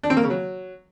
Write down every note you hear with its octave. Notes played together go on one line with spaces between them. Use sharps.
D4
C4
A#3
C#3
F#3